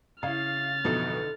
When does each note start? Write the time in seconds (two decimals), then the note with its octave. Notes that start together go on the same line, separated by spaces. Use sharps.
0.23 C#3 E4 F5 F6 A6
0.84 A1 F2 B2 D3 D#4 A4